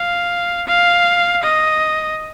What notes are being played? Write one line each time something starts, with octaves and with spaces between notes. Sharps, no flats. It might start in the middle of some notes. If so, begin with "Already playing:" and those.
Already playing: F5
F5
D#5